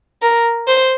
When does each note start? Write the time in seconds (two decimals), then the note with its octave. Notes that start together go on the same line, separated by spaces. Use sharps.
0.22 A#4
0.67 C5